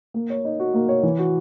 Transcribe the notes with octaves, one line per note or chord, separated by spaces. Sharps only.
A#3
C#5
D#4
F#4
A#3
C#5
E3
F#4